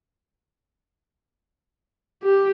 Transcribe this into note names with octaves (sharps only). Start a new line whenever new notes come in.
G4